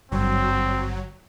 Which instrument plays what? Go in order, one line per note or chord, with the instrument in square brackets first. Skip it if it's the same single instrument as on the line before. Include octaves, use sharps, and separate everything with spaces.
[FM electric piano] G#1 G2 D3 [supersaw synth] F#3 [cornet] C4